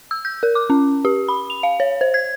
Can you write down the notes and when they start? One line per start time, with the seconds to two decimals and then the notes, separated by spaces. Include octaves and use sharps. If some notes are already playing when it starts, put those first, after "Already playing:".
0.11 E6
0.25 G6
0.43 A#4
0.55 D6
0.70 C#4
1.05 G4
1.28 B5
1.50 F7
1.63 F5
1.80 C#5
2.01 C5
2.14 G#6